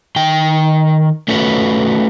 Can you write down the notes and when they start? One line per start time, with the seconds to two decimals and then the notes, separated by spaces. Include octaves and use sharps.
0.16 D#3 G5
1.28 A3 C#4 F#4 B4